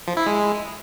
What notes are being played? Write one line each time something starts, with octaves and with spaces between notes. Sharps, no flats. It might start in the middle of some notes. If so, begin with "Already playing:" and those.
F3
E4
G#3